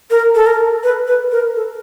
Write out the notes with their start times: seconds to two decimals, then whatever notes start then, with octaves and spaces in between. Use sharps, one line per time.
0.11 A#4
0.35 A4
0.46 A#4
0.83 B4
1.07 B4
1.31 A#4
1.56 A4